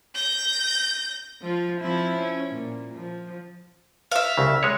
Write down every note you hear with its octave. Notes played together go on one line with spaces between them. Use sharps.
G6 A#6
F3 F4
F3 C4 E4
C#4
A#2
F3
E5 F5
C2 C#3
G#3 C#5